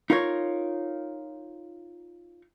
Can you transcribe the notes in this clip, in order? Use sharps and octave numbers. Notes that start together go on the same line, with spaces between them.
D#4 F4 A#4 C#5